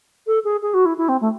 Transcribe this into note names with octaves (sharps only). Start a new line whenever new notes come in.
A4
G#4
G#4
F#4
E4
E4
C4
A3